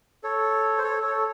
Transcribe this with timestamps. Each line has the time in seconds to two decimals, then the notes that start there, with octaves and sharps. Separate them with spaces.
0.24 A4 C#5
0.78 C5
0.83 A4 C#5
1.03 A4 C#5